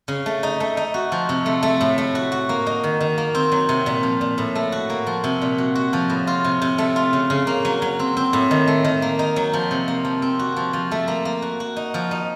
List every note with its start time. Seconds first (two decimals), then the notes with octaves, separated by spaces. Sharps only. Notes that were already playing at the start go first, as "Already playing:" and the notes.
0.08 C#3
0.26 A3
0.43 D#4
0.60 A3
0.77 D#4
0.94 F#4
1.12 F3
1.29 C3
1.46 A3
1.63 A3
1.81 A2
1.98 A3
2.15 F#4
2.32 F#4
2.49 A#3
2.66 D#4
2.84 D#3
3.01 D#3
3.18 A#3
3.35 C4
3.52 F#3
3.69 C3
3.86 A#2
4.03 F3
4.21 A#2
4.38 A2
4.55 A3
4.72 F#4
4.90 A#3
5.07 F3
5.24 C3
5.42 A#2
5.58 F#4
5.75 F#4
5.93 F3
6.10 A2
6.27 F4
6.44 C3
6.62 C3
6.78 A3
6.96 F4
7.13 C#3
7.30 C#3
7.47 A#3
7.65 F#3
7.82 F#3
7.99 C4
8.17 C4
8.33 A2
8.51 D#3
8.68 A3
8.85 D#3
9.02 A#3
9.19 D#4
9.36 F#3
9.53 F3
9.71 C3
9.88 A#3
10.05 F3
10.22 C4
10.39 F#4
10.57 F3
10.73 F3
10.91 A3
11.08 A#3
11.25 A#3
11.42 F#4
11.60 F#4
11.76 D#4
11.94 F3
12.11 D#4